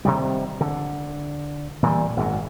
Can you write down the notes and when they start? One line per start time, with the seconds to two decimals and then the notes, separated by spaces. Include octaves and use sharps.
0.05 C3 D#3 G3
0.61 D3
1.83 A#2 E3 F#3 G3
2.17 G#1 F#2